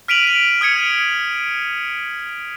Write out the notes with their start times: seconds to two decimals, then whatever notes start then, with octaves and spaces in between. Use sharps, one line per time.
0.08 F6 B6 D7 D#7 F7 F#7
0.24 B6 F7
0.61 D#6 F6 G#6 C#7 D#7